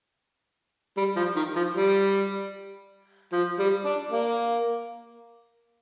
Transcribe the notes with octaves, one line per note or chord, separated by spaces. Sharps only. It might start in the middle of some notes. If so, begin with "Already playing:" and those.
G3
F3
D#3
F3
G3
F3
G3
D4
A#3